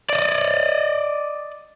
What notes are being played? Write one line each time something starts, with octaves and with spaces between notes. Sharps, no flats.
D5 D#5